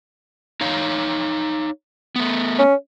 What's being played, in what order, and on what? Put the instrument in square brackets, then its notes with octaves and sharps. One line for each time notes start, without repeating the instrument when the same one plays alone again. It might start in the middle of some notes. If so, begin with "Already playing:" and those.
[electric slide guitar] D#4 C#5 F5
A3 B3
[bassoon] C#4